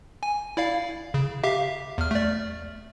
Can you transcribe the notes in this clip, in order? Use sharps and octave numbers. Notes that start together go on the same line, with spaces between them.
G#5
E4 D5 F5
C#3
G4 E5 F5
E2 F6
A3 D5